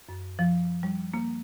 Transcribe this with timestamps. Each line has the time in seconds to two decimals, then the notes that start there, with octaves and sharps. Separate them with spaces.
0.09 F#2
0.39 F3
0.83 G3
1.14 A#3